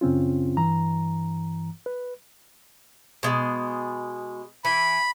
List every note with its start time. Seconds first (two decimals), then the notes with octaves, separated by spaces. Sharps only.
0.01 F#2 C#3 C4 C#4 F4
0.57 G2 E3 A#5
1.86 B4
3.23 B2 G#3
4.65 E3 B5